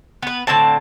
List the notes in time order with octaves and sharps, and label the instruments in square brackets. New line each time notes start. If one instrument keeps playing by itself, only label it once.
[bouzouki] B3 B4
A2 D3 C4 A5